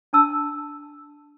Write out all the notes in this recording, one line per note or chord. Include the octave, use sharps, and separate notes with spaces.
D4 A5 E6